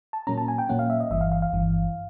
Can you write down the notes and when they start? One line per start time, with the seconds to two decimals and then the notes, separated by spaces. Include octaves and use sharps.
0.13 A5
0.27 A#2 F#3 A#3 C#4 A#5
0.38 A5
0.48 G#5
0.58 G5
0.69 A#2 F#3 A#3 C#4 F#5
0.79 F5
0.90 E5
1.00 D#5
1.10 G1 G2 E3 E5
1.21 F5
1.32 F5
1.42 F5
1.53 G1 G2 E3